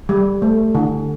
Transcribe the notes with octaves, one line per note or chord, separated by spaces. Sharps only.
G3
A3
D3